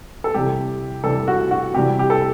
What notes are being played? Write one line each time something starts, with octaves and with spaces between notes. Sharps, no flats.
A4
C3 E3 G3 G4
C3 E3 G3 A4
F#4
F#4
C3 E3 G3 G4
G4
A4